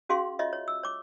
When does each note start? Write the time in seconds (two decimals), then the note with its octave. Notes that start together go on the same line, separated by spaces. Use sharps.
0.09 C#4 F#4 G#4 F5 C6
0.39 F4 C#5 D#5 E5
0.53 C#5
0.68 E6
0.83 C#5 D6